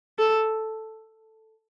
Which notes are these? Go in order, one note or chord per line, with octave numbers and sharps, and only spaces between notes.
A4